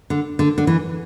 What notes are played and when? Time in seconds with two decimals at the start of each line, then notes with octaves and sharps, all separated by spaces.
0.10 D3
0.39 D3
0.58 D3
0.67 E3